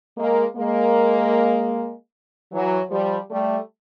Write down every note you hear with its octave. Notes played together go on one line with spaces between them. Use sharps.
G#3 A#3
G#3 A#3
E3 F#3
F3 G3
G3 A3